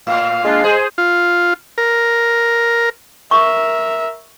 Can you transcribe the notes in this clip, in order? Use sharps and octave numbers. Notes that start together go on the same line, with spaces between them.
A2 F5
G#3 A#3 D4 F4
G#4 C5
F4
A#4
A#4 E5 C#6